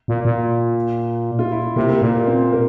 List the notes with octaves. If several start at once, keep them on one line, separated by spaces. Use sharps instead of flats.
A#2
A#2
F4
E4
C3 A#3
A#3
A#2 A#3
A#3
C4
A#4